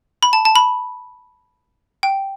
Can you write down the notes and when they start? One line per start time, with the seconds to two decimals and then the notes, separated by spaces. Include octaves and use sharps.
0.23 B5
0.33 A5
0.45 A5
0.56 B5
2.03 G5